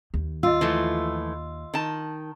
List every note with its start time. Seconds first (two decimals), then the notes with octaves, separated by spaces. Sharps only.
0.14 D#2
0.43 F4 D#5 E6
0.61 E3 F3 A3
1.74 D#3 A5